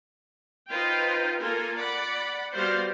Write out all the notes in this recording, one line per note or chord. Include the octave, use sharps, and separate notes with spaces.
D#4 F4 B4 C5 F5 G5
A#3 F4 A4 A#4 G#5
D5 F#5 B5
G3 B3 F#4 C5 D5 F5